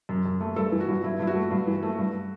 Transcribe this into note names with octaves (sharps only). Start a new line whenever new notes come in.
F#2
F#2
A3
G2 A4
E3
F#4
G2
G2 E4
G2 E4
F#4
A3
G2
E3
A3
G2